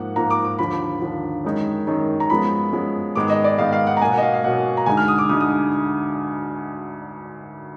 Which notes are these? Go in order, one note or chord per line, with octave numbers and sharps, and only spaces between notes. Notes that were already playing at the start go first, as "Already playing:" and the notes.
Already playing: G#2 F3 A#3 F#5
G#2 F3 A#3 A#5
D6
D6
D#2 D3 F3 B5
D#2 D3 F3
F#2 D#3 G#3 D#4
F#2 D#3 G#3 D#4
A#5
F#2 F3 G#3 B3 B5
F#2 F3 G#3 B3
G#2 D#3 G#3 B3 D#4 D6
D#5
D5
G#2 D#3 G#3 B3 D#4 F5
F5
F#5
A#5
B2 F#3 A#3 G#5
F#5
D#5
F5
F5
B2 F#3 A#3 F#5
A#5
D2 D3 G#3 D#4 G#5
F6
D#6
D6
D2 D3 G#3 D#4 D#6
D#6